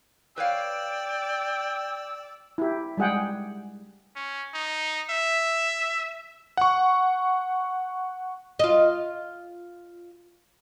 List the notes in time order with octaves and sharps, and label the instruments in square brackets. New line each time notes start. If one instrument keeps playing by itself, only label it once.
[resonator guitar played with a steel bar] B4 C#5 F5 [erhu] D5 [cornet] G5 [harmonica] E6
[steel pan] E4 G4
G3 G#3 G#4 F#5 G5
[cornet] C#4
D#4
E5
[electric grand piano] F#5 C#6
[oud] F4 D#5